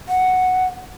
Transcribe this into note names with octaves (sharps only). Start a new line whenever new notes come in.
F#5